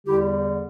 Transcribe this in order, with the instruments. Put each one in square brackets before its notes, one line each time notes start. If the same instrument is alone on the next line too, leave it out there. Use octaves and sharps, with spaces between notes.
[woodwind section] E2 D3 G3 E4 G4